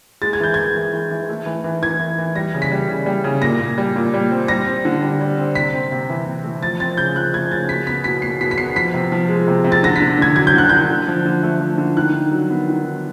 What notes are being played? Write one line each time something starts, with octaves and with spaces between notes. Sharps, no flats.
G#3 A6
G#6
E3 G6
E3 G#6
E3
E3
E3
A3
E3
E3
E3 G#6
E3
E3
G3 A#6
C#3
B6
G3
C#3
G3
C#3
A#2 A#6
A#2
G3
A#2
G3
C4
G3 A#6
C4
D3
G3
G3
C4
C3 B6
C4
C3
E3
C3
A3
F3 A6
C4 A6
C#3 G6
F3 F#6
A3 G#6
C#3 A6
B2 B6
B3 B6
B2 B6
B2 C7
B2 B6
B6
B3 C7
F3 B6
C3
F3
G#3
C3
C3
A6
D3 A#6
B6
D3
D3 G#6
F#3 G#6
G6
D3 F#6
D3 G6
D3
F3
D3
A3
F3
D3
D#3 F#6
D#3
F#3
B3
D#3
F#3